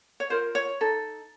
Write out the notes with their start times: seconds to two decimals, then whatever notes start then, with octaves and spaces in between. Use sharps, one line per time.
0.20 C#5
0.30 F4 A#4 C5
0.55 C#5
0.81 D#4 A4